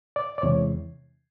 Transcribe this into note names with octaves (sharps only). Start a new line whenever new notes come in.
D5
D5
E2 C3 E3 G#3 C#5